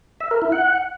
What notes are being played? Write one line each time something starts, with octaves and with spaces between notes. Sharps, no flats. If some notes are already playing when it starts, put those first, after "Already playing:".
E5
A#4
E4
F#5